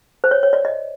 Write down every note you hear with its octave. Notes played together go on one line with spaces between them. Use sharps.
C5
C#5
C#5
D5
D#5